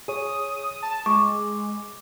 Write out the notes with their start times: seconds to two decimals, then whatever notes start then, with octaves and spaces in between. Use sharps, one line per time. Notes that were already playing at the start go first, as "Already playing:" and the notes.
0.08 G#4 C#5 D#6
0.82 A5
1.06 G#3 C#6 D6